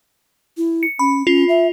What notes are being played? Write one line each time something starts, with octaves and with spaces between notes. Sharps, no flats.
E4
C#7
C#4 B5
C#4 F4
E5